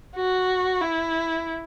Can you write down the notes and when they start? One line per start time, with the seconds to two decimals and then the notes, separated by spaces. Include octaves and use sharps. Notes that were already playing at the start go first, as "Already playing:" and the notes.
0.16 F#4
0.81 E4